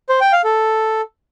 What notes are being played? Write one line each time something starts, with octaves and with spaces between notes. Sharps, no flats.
C5
G5
F5
A4